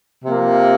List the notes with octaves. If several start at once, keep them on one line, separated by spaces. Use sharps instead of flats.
C3 F3 A#3